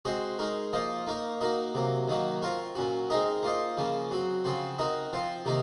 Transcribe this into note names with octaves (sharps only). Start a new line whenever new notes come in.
G#3 C4 F#4 C5 D#5
G#3 D#4 A#4 C#5
F3 A#3 F4 C5 D#5
A#3 D#4 A#4 C#5
A#3 D#4 F#4 A#4 D#5
C3 F#3 A#3
D#3 F#3 A#3 D#4 F#4
C4 F4 A#4 C#5
A#2 F#3 C#4 F#4
G#3 C4 D#4 A#4 D#5
A#3 F4 C5 D#5
C#3 F3 A#3 C#4
F#3 C4 F#4
C#3 F3 C4 F#4 C5
C4 D#4 F#4 A#4 D#5
F3 C4 F4 C5
C3 D#3 A#3 D#4 A#4